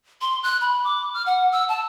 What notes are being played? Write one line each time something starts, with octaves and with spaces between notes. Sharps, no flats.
C6
F#6
B5
D6
F6
F#5
E6
A5